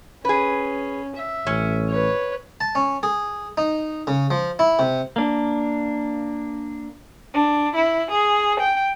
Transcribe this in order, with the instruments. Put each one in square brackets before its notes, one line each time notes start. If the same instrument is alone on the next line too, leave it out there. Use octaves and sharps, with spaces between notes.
[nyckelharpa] C#4 [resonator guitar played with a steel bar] G#4 B4
[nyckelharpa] E5
[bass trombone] A1 [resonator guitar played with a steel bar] C#4
[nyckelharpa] B4 C#5
[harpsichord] A5
C#4
G#4
D#4
C#3
F3
E4
C3
[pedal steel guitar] A#3 D4
[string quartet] D4
E4
G#4
G5